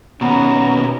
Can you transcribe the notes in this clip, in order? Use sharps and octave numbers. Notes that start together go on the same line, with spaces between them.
E2 B2 D#3 C#4 F#5 A#5